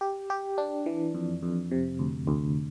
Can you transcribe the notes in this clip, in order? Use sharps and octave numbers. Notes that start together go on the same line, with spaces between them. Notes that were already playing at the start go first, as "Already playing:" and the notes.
G4
G4
D4
E3
F2
F2
C3
D2
D2